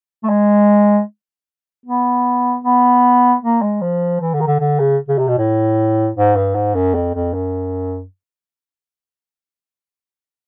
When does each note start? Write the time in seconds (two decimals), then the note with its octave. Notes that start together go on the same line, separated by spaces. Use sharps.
0.23 A3
0.29 G#3
1.86 B3
2.64 B3
3.42 A#3
3.62 G#3
3.81 F3
4.21 E3
4.34 D3
4.40 D#3
4.47 D3
4.60 D3
4.79 C#3
5.08 C#3
5.18 C3
5.28 B2
5.38 A2
6.16 G#2
6.36 G2
6.55 G#2
6.75 F#2
6.94 F2
7.14 F2
7.34 F#2